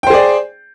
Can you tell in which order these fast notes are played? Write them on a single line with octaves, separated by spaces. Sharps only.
G5 C5 G#4 D5